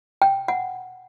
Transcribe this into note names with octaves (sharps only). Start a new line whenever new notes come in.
G5
F#5